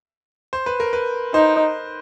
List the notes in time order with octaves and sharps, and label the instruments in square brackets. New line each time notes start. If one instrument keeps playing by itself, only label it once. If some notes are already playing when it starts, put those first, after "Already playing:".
[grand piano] C5
B4
A#4
B4
[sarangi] D#4 [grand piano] C5